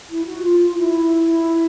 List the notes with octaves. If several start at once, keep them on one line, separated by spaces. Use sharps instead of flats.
E4
F#4
F4
E4